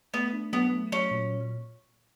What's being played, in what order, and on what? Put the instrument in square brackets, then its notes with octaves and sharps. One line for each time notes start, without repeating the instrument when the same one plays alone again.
[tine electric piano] A3 [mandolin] B3
[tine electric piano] D4
[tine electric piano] F#3 [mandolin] B3
[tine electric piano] A3
[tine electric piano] F#3 [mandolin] C#4
[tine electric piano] A#2